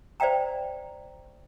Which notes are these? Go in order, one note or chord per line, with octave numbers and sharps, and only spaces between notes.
C5 D5 E5 F5 G5 A#5